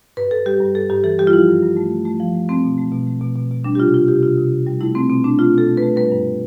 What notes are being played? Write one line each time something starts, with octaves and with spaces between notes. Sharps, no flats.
G2 B4
G2 A4
G3 G4
G2
G2 A4
G2 G4
E3 A4
G3 G4
F4
F3 E4
G2
G2
A3
A3
A3
F3
A3
A3 C4
B2
A3
B2
A3
B2
B2
B2
G3 D4
G4
C3 F4
G3 F4
C3 G4
C3 F4
C3
C3
G3
A3 E4
A3 C4
B2 C4
A3 D4
A3 F4
B2 A4
A3
B4
A3
G3 B4
G2